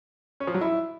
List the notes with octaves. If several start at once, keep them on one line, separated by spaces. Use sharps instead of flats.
C#4
F3
F#3
E4